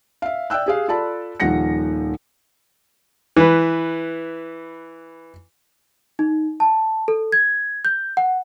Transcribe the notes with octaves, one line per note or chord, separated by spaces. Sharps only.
E5 F5
D5 E5 G5 E6 F#6
G4 G#4 F5
F4 A4 D5 A5 B5
D#1 D#3 F3 F#5 A#6 C#7
E3 B4
D#4
A5
A4
G#6
G6
F#5